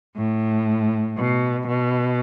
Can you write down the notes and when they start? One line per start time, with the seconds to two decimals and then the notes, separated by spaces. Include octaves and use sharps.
0.17 A2
1.17 B2
1.68 B2